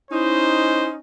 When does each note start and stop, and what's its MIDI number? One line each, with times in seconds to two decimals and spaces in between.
0.11 1.00 61
0.11 1.00 63
0.11 0.87 64
0.11 0.93 72